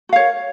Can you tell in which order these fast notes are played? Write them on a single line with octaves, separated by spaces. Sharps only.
F#4 F5 C#5 A#4